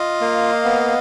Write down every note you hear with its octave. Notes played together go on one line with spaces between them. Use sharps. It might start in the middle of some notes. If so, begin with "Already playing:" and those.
Already playing: F4 D#5 F5
A#3
B3